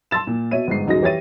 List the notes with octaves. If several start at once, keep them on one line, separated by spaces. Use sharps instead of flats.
A5 C6 E6 A6 E7
A#2
B2 C#5 E5 D#7
G1 G#2 C7
D#1 F#2 D#4 F#4 G#4 A#6
E3 G4 C#5 E5 A6 D#7